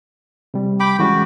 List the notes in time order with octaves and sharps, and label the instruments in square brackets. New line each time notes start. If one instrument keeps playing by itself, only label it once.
[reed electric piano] C3 G3
[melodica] G5 B5 D6
[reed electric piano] E3 G#3 C#4 [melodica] F#4